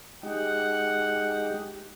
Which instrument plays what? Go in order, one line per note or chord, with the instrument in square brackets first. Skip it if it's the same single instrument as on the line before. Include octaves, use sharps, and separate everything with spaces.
[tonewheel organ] G#3 D#4 G4 [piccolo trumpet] F#5